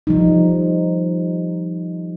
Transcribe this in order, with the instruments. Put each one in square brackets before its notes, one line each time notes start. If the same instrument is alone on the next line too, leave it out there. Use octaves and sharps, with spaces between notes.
[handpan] F3 G3 D#4